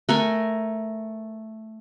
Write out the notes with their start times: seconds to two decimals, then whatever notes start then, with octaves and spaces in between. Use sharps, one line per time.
0.09 A3 A#4 G#5